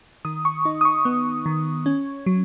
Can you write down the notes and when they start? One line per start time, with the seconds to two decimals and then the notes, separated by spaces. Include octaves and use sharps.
0.25 D#3 D#6
0.45 C#6
0.65 D#4
0.81 D#6
0.85 C#6
1.05 B3 C#6
1.46 D#3
1.86 C#4
2.26 F#3